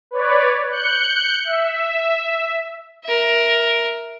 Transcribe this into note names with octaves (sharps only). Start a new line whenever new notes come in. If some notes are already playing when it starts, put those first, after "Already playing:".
B4 C#5 D5
F#6 G6 C#7
E5
A#4 E5